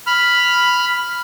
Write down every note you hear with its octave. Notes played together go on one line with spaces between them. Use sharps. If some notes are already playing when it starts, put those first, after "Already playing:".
B5 F6